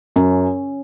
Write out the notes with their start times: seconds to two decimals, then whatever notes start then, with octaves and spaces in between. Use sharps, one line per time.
0.16 F#2 C#4